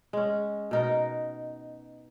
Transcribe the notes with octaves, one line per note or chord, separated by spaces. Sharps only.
G#3 C#4
B2 D#4 A#4